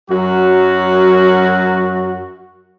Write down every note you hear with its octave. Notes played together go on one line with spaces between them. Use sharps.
F#2 F#3 F#4